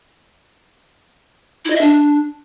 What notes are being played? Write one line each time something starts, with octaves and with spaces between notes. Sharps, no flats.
E4
D#5
E5
D4